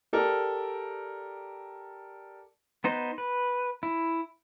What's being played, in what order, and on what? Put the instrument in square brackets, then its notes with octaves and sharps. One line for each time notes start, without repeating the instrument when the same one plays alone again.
[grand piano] G4 A4 A#4 D5
[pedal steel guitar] B3 D#4 C5
B4
E4